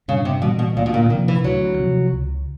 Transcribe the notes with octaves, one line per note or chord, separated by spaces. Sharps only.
G2 C#3
C3
B2 E3 G3 B3
B2
D2 A#2
B2
A#2
C3 D#3 F3
E3
D2 F#3
C3 F3
C#2